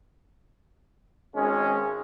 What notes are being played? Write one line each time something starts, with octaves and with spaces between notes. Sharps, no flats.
G#1 G#3 C#4